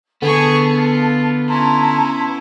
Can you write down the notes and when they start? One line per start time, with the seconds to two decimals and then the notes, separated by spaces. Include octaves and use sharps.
0.22 D3 B3 G#4 A4 C#6
0.76 F4
1.49 C#4 E4 A5 A#5 C6